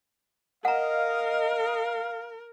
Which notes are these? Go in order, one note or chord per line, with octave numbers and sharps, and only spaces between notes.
A#4 D#5 F5 F#5 A#5